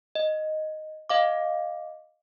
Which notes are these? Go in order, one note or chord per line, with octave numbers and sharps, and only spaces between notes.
D#5
D#5 F5 D6